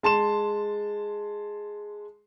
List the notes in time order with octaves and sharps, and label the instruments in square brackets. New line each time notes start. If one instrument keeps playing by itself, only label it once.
[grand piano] G#3 A5 C6 E7